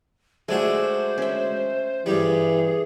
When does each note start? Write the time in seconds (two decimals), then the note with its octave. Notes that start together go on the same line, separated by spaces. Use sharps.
0.48 G#3 A3 D4 F#4 G#4 C5
1.18 C#4 E5
2.06 G2 E3 G3 G#4 C#6